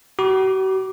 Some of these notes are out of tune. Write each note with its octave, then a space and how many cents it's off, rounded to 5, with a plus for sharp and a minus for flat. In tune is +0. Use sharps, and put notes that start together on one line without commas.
F#4 +45 B5 -40 D6 +0